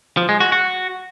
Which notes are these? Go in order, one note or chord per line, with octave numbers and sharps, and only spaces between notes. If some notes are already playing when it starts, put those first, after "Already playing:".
F3
G#3
F#4
F#4